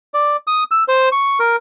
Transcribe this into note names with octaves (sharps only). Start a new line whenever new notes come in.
D5
D#6
E6
C5
C#6
A#4